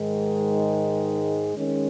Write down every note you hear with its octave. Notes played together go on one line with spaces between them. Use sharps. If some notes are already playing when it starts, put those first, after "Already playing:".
Already playing: G#2 D#3 G#3
D#3 G#3 C#4